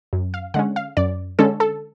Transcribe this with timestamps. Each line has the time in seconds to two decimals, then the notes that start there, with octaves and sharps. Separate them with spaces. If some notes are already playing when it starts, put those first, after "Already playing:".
0.13 F#2
0.34 F5
0.54 D3 G#3 C#4 F#5
0.76 F5
0.97 F#2 D5
1.39 D3 G#3 C#4 A4
1.60 A4